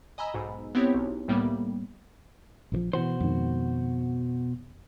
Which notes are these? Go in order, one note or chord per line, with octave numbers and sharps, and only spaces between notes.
D#5 G#5 A#5 B5 E6
B1 G#2
B3 C4 E4 G4 C#5
B1
C2 A2 G3 A#3 B3
A#1 D#3 F3
B2 E3 F#4 C5
F2 G#2 D#3